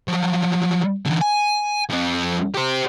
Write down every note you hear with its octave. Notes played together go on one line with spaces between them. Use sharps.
F3 F#3
D3 E3
G#5
F2 C4
G4 C5